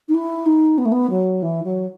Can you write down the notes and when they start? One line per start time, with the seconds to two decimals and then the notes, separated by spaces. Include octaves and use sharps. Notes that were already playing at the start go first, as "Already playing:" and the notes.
0.08 D#4
0.14 E4
0.45 D#4
0.78 B3
0.85 A3
0.91 B3
1.09 F#3
1.42 E3
1.63 F#3